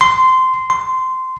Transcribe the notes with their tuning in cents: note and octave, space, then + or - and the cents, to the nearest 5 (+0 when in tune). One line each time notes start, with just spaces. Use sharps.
C6 -15
C6 -15